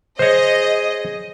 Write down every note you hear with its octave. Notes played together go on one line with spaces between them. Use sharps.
G#4 C5 C#5 D#5